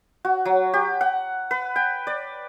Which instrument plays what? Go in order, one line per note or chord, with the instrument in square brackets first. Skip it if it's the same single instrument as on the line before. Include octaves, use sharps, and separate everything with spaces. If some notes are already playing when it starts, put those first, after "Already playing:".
[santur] F#4
F#3
G4
F#5
B4
G5
D5